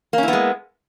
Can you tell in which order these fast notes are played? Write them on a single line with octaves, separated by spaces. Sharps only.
A#3 C#4 E4 B3 G#3